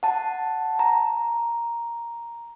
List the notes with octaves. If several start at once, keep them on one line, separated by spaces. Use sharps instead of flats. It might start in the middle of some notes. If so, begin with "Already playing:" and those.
F#5 A5
A#5